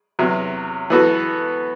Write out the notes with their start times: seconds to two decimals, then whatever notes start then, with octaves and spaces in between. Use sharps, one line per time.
0.19 E2 C3 F#3
0.90 E3 B3 F#4 A4